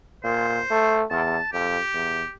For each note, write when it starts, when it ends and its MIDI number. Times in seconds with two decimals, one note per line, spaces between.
0.24 0.60 46
0.24 0.98 72
0.71 1.03 57
1.10 1.38 40
1.10 1.52 81
1.53 1.78 41
1.53 2.31 67
1.93 2.22 40